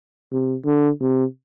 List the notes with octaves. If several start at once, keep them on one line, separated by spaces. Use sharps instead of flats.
C3
D3
C3